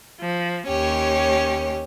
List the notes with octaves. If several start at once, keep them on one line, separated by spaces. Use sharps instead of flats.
F3
D#2 C#4 G4 C#5